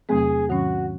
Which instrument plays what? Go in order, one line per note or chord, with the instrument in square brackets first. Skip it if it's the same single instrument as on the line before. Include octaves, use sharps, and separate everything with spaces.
[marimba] E2 C3 F#3 A3 C4 [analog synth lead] G#4
[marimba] G#2 D#3 F#3 C#4 [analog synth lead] F#4